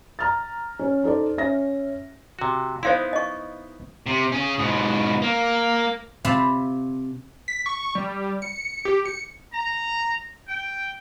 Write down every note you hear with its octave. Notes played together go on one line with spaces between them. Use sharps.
A#5 F6 A6
C#4
D#4 A4 C5 D5
C#4 E5 A#6
C3 F#4
B3 D#4 E4 C5 F5 C6
D#5 C#6
C3
C#4 G#4
G#2 B2
A#3
C3 C4 F4 A5 B5
B6
C#6
G3
C#7
G4
C#7
A#5
G5